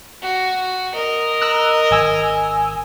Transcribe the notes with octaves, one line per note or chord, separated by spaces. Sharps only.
F#4
A#4 D#5
A#5 E6 F#6
G#1 G#5 E6